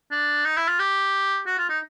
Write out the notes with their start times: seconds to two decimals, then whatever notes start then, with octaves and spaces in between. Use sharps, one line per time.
0.11 D4
0.45 D#4
0.57 E4
0.68 F4
0.80 G4
1.47 F#4
1.58 F4
1.69 D#4